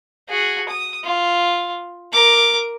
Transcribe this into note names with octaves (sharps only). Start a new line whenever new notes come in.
F#4 G#4
D#6
F4
A#4 D6